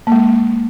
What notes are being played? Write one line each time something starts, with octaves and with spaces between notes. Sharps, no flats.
A#3
G#3